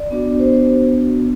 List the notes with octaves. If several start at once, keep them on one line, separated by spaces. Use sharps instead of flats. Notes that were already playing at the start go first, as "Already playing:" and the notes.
Already playing: D5
B3 D4 F#4
C5
C5